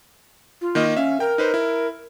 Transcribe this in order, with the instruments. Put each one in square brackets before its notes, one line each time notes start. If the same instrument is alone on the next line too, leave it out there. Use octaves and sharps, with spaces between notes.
[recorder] F4
[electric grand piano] D#3 A#3 D#5
[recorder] C#4 [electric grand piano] E5 F5
[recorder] A#4 [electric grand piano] G5
[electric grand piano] D#4 B4 C5
E4